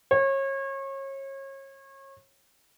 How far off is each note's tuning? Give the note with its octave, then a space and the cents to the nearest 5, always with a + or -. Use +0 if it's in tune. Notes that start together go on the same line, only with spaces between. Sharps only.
C#5 -30